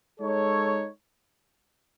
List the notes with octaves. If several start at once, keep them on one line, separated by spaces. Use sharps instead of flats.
G#3 D#4 A4 C#5